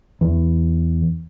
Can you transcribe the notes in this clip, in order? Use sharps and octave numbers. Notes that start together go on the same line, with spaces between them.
E2